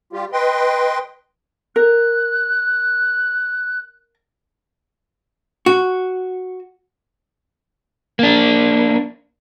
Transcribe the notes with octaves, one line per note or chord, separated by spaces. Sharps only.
G3 F4 G4
B4 D#5 G5 C6
A#4 F#6
F#4
A#3 D4